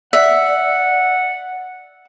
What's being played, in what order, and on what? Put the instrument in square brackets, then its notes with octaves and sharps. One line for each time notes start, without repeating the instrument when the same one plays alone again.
[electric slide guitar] D5 [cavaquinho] E5 [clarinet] F#5